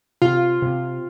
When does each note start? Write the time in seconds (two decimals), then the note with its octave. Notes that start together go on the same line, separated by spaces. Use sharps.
0.22 C3 F4
0.62 C3